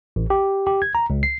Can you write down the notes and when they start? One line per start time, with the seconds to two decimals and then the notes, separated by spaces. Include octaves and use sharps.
0.16 A1
0.30 G4
0.67 G4
0.82 G#6
0.95 A#5
1.10 C#2
1.23 C7